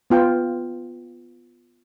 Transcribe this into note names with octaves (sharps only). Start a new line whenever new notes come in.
B3 F4 G5